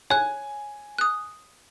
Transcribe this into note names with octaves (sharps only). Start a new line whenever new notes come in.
C#5 G#5 F#6
D#6 F#6